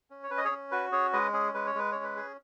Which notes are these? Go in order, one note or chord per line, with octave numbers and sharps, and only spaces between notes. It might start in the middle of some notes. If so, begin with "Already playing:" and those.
C#4
C#5
C#4 B4
D#5
G#4 C#5
C#4
F#4 B4
C#4 G#4 C#5
G#3 B4 D#5
C#4 G#4
G#3 B4
C#5
G#3 B4
C#4 C#5
B4
G#4